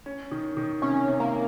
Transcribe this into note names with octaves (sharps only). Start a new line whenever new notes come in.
C#4
D#3
D#3
C3 C#4
C3
A#3